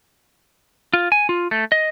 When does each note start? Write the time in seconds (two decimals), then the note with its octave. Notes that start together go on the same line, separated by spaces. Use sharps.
0.93 F4
1.12 G#5
1.29 F4
1.51 A3
1.72 D#5